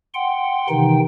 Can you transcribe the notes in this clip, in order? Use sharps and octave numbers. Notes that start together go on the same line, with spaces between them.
F#5 G5 C6
C3 D#3 E3 D#4 G5